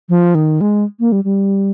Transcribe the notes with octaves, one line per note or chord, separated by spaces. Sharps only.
F3
D#3
G#3
A#3
G3
G3